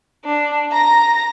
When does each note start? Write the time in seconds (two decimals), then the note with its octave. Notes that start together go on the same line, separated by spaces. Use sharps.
0.25 D4
0.71 A#5 A#6